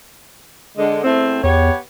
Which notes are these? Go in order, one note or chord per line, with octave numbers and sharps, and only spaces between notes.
D3 G#3
E2 A3 C4
E2 B3 G4 C#5